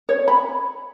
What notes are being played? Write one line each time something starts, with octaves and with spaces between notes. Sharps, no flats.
C#5
B5